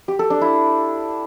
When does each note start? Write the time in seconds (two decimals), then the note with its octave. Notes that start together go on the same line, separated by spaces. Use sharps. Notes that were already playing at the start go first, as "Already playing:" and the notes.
0.08 G4
0.19 A4
0.30 D4
0.41 E4